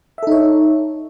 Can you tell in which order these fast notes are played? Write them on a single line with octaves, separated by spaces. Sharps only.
E5 A4 D#4 C#5